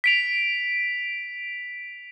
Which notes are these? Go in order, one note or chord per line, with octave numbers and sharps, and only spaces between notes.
B6 D7 F7